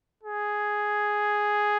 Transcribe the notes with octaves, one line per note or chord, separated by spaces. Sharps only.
G#4